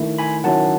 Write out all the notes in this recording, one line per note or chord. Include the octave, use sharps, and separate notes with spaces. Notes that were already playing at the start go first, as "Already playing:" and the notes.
Already playing: D#3 A3 E4
G#5 B5
D#3 F#3 C#4 E4 F#5 A5